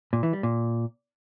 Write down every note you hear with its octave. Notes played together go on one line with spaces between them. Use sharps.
A#2
E3
G3
A#2